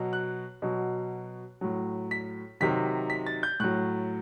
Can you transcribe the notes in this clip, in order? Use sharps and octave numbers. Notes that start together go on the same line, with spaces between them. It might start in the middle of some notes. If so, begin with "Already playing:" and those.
Already playing: B2 F#3
F#6
B2 F#3
A2 F#3
B6
C3 D#3 F#3 B6
B6
A6
G6
A2 F#3 F#6